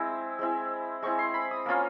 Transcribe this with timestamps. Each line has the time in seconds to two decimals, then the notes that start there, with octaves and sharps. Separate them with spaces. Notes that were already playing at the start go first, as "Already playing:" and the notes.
Already playing: G#3 C4 E4
0.39 G#3 C4 E4
1.02 G#3 C4 E4 C#6
1.19 C6
1.34 B5
1.51 D#6
1.66 A#3 C#4 F4